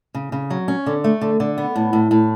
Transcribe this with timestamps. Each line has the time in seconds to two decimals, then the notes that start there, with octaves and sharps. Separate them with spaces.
0.15 C#3
0.32 C#3
0.50 F#3
0.68 C#4
0.86 D3
1.04 A3
1.21 D3
1.40 D3
1.58 B3
1.76 A2
1.93 A2
2.11 A2